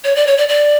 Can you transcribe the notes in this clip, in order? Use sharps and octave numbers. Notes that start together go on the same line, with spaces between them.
C#5
D5
C#5
D5
D5